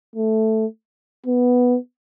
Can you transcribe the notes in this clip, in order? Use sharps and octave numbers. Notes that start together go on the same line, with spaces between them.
A3
B3